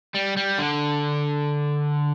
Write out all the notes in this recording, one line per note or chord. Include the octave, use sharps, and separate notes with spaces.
G3
G3
D3